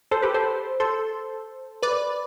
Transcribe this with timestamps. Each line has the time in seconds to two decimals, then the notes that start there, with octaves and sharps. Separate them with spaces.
0.11 A4 C5
0.22 G4 B4
0.34 A4 C5
0.80 A4 C5
1.82 B4 D5